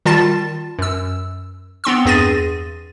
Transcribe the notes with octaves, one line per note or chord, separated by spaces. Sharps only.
D#3 G3 F4 A5 A6
F#2 E6
B3 C4 C6 E6
E2 G2 G#4 A6 A#6 D#7